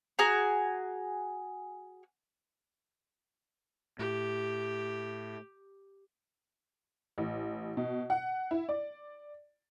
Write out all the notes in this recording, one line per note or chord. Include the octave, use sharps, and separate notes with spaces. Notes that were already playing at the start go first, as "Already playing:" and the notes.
F#4 G#4 G#5 A#5
A2 G4
A1
B2
F#5
E4
D5